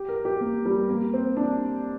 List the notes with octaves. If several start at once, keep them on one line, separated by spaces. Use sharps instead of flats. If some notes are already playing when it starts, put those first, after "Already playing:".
Already playing: G4
A#4
G4
A#3
G3
A#3
C4
D4